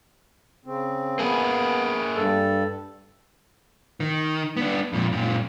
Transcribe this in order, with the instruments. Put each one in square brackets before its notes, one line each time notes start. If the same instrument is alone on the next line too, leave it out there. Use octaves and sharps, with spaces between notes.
[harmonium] C#3 C4
[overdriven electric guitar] A#3 G#4 [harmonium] B3
[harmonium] G2 A4
[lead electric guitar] D#3
B3 D4
F2 A#2
F#2 A#2